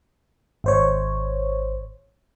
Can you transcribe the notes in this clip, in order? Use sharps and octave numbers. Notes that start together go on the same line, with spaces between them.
G#1 C5 C#5